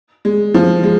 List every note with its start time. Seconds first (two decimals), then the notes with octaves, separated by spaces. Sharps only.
0.25 G#3
0.54 F3
0.83 G#3